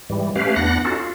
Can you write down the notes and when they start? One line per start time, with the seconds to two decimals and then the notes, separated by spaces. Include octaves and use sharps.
0.10 G#2 E3 G3
0.35 A3 C#4 G4 B4 F5
0.56 E2 B3 D4 F#5 F#6 A#6
0.85 C#4 D#4 F4 F#4 A4
1.00 F4